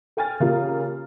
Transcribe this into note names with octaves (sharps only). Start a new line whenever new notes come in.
A4 G5 G#5 F6 A6
C#3 A#3 F4 G4